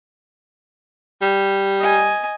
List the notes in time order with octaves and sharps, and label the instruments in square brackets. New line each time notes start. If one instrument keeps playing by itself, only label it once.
[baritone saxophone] G3
[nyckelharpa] D#5 G#5